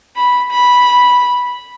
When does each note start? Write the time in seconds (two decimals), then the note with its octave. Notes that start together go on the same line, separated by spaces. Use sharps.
0.16 B5
0.51 B5